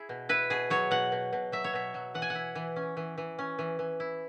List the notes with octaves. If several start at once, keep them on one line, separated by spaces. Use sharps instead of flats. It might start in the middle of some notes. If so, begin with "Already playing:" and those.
Already playing: E4 G#4
B2
E4 B4
B2 G#4
F#3 C#5
B2 F#5
B2
B2
F#3 E5
C#5
B2 E5
F#3
E3 F#5
G#5
F#5
E4
E3
C#4
E3
E3
C#4
E3
E3
E4